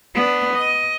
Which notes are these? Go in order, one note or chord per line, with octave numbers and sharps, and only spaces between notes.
B3 D4
D#5